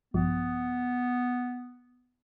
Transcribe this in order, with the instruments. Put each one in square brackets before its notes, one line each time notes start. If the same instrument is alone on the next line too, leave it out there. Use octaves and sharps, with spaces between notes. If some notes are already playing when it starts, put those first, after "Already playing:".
[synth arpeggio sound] A#1 G2 F3 [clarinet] B3